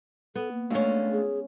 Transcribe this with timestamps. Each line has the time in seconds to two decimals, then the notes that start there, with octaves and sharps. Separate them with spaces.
0.35 B3 A4
0.52 A#3
0.70 G#3 A3 C#4 D4 F4
1.12 G#4